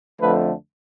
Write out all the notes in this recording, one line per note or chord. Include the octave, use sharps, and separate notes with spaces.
F2 D3 F3 A3 B4